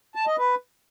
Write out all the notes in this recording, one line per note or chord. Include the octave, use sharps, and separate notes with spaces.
A5
D#5
B4